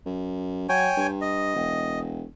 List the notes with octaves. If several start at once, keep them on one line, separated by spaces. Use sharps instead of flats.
F#2
F#3 C#5 G5 G#5
G2
D#5
E1